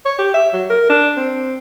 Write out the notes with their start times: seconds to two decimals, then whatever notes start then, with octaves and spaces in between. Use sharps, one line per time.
0.05 C#5
0.19 G4
0.34 E5
0.53 F#3
0.70 A#4
0.90 D4
1.17 C4